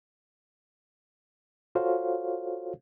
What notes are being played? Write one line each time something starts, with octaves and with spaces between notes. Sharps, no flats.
F4 F#4 A4 C5 C#5 F5